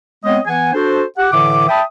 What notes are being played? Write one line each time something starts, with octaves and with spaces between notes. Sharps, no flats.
G#3 B3 C4 C#5 D#5
E3 B3 F#5 G#5
D4 F#4 A4 C5
G4 F#5
A2 D3 E3 E5 D6
E5 G5 A5 B5 D#6